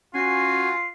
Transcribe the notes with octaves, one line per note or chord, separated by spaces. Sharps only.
C#4 F4 F#4 G#5 C7